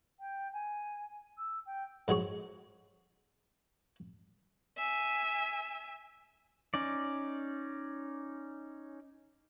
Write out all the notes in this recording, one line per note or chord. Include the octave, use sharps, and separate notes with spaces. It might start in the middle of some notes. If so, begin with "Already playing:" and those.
G5
G#5
E6
G5
G#2 F#3 G#4 C#6
E5 G#5
C#4 D#4 D5